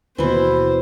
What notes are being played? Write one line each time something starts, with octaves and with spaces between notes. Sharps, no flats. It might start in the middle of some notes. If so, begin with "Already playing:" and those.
D#2 B2 E3 E4 C5